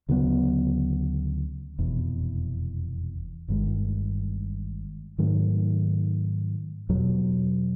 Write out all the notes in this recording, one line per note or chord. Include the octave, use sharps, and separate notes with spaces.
D2 C#3 F#3 B3
F1 E2 B2
G1 G2 D#3 G#3
G#2 D#3 F#3 A3
E2 B2 F#3